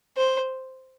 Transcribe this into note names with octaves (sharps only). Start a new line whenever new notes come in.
C5